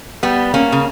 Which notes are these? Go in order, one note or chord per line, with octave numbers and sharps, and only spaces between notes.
G3 B3
A#3 C#4
C#3